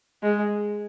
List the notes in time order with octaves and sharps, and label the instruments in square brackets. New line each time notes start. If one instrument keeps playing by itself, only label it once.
[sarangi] G#3